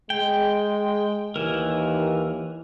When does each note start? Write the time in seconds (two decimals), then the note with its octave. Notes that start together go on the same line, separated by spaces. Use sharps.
0.10 G#3 G5
1.36 D#2 E3 A#4